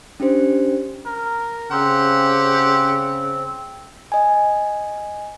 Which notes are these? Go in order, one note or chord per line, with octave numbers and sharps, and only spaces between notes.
C#4 D4 G4 C5
A#4
C#3 C4 G4 C5 F#5
D#5 G#5